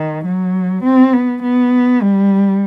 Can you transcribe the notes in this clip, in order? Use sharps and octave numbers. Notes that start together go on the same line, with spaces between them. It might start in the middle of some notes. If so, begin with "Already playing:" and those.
Already playing: D#3
F#3
C4
B3
B3
G3